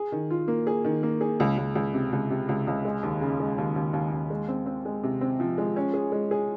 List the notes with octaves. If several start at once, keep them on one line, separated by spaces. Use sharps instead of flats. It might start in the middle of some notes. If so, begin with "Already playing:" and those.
Already playing: G#4
D#3
F4
A#3
G#4
D#3
A#3
G#4
C#2
C#2
C#2
C3
C#2
C3
C#2
C#2
G#3
D#2
C#3
G#3
D#2
D#2
D#2
D#2
G#3
C4
C4
G#3
C3
C4
F3
G#3
C#4
G#4
G#3
G#4